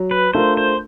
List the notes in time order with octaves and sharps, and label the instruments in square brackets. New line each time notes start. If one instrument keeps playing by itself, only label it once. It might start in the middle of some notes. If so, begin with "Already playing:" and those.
Already playing: [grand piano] F#3
[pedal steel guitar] B4
[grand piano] A3 D4 F4 A#4 [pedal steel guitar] C5
[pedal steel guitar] C5